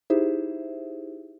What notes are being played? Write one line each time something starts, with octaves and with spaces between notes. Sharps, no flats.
D#4 E4 G4 G#4 C5 E5